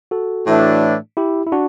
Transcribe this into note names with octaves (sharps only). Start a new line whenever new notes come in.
F#4 A4
A2 E3 A3 D4
E4 G4
E4
D4 F#4